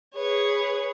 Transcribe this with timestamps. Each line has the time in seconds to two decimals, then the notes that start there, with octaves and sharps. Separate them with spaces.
0.14 G#4 B4 C#5